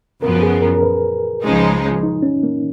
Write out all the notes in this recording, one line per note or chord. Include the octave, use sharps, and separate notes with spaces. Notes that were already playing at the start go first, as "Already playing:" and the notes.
F#2 C#3 F3 B3 A#4
G#4
A#4
A#4
B4
C#2 C#3 F3 G#3 D#4
D#4
C#4
A#3